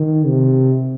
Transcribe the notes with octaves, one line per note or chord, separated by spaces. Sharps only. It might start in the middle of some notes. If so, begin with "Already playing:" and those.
Already playing: D#3
C3